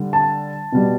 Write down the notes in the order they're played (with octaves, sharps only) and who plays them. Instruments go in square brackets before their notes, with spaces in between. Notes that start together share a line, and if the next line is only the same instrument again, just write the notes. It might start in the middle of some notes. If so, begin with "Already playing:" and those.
Already playing: [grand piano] D3 G3
A5
B2 G3